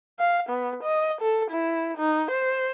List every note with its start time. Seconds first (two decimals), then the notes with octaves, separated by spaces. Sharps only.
0.19 F5
0.49 B3
0.83 D#5
1.21 A4
1.50 E4
1.97 D#4
2.31 C5